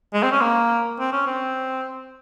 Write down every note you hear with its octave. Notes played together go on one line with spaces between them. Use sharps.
G#3
C4
C#4
A#3
C4
C#4
C4